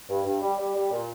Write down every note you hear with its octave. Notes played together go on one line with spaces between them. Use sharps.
G2
G2
G3
G3
G3
A#2